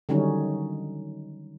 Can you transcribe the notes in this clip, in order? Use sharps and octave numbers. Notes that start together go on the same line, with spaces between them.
D3 D#3 F#3 G3 C#4 D#4